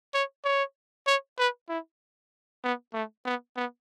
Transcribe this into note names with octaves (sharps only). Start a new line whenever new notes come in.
C#5
C#5
C#5
B4
E4
B3
A3
B3
B3